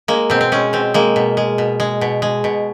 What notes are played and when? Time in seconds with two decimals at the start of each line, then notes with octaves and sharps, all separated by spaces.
0.08 G#3 A#3
0.30 B2 C4
0.41 C4
0.52 G#3 C#4
0.73 B2 C4
0.94 G#3 A#3
1.16 B2
1.37 G#3
1.58 B2
1.80 G#3
2.01 B2
2.22 G#3
2.44 B2